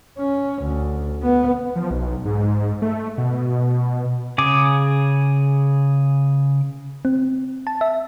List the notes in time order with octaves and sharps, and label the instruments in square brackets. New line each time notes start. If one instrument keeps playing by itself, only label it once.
[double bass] C#4
D2
B3
[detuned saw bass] F3
B1
G#2
A3
B2
[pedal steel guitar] C#3 G#4 D6
[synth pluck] C4
A5
E5